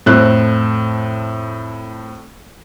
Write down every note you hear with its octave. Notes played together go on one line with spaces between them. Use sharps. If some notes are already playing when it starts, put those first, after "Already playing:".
F2 A2 C4 F#6